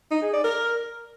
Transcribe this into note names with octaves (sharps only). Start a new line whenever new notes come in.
D#4
G#4
D5
A#4